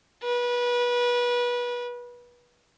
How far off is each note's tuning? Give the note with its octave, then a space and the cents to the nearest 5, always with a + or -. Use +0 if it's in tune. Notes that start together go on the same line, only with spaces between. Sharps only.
B4 -25